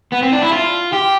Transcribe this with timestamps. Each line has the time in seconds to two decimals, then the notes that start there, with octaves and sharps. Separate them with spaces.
0.12 B3
0.22 C4
0.33 D4
0.42 E4
0.52 F4
0.93 G4